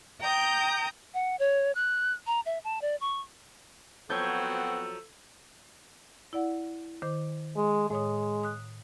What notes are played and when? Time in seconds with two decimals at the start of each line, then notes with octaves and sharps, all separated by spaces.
0.21 G5 A#5 D#6 G6
1.14 F#5
1.39 C#5
1.75 F#6
2.27 A#5
2.46 E5
2.64 A5
2.82 D5
3.01 C#6
4.10 F3 F#3 B3 C4 F#4 A4 G6 G#6
6.33 E4 D5 F#5
7.02 D#3 C5 D6
7.56 G#3
7.90 A2 G#3 C#5 D#6
8.43 D#6 F#6